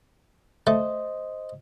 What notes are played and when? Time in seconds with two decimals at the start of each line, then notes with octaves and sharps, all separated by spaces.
0.67 A3 C5 D#5